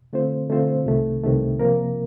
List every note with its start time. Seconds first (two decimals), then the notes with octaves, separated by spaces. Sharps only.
0.13 D3 A3 C4 F4 C5
0.49 D3 A3 C4 F4 C5
0.86 C2 C3 D#3 A3
1.23 C2 C3 D#3 A3
1.60 C3 F3 A#3 F4 A#4